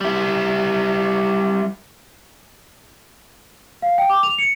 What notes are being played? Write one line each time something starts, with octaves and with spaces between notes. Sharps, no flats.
G3 E4
F5
G5
D6
F7
C#7